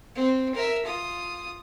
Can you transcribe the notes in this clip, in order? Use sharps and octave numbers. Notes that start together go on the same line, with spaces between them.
C4
A#4 E5
F4 D#6